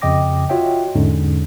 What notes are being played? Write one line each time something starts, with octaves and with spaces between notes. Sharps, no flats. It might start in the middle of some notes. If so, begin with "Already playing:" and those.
F2 C#3 D#5 G5 D6 A#6
F4 F#4 C#5 D#5 E5 G5
E2 G#2 D3 C#4